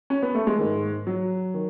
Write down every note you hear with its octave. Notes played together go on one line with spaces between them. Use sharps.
C#4
B3
A3
G#3
G#2 D#3
F#3
D#3